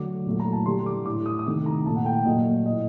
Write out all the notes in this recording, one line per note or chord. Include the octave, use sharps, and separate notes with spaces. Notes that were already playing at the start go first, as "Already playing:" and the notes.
Already playing: D3 F#3 A3 D6
A#2 F#3 A3
A#5
A5
D3 G3 C6
D6
A2 A3 D6
D#6
D#6
C3 D#3 A3 D6
A#5
A#2 A3 A5
F#5
G5
A#2 F#3 A3 D#5
A2 A3 D#5